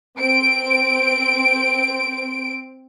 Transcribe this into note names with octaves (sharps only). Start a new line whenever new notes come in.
C4 D7